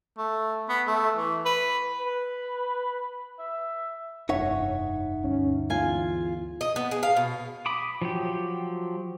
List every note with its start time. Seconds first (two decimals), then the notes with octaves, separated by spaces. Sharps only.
0.18 A3
0.69 B3
0.87 A3
1.17 E3
1.46 B4
2.00 B4
3.39 E5
4.29 F1 G2 D#4 C#5 E5 F#5
5.24 D2 G2 D3 C#4
5.70 E2 F4 G#5
6.61 D#5
6.76 B3
6.91 G#4
7.03 F5
7.17 B2
7.66 B5 D6 D#6
8.02 F3 F#3 G4